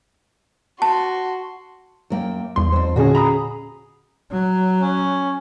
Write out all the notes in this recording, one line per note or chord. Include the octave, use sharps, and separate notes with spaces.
F#4 A5 C6
F#2 A#3 G5
E2 G2 C6
F2 C5
A#2 D3 C#4 F#4 G#4 D#5
A#5 B5 D#6
F#3
C#4